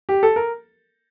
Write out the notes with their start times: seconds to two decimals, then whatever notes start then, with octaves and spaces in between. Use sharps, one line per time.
0.09 G4
0.23 A4
0.36 A#4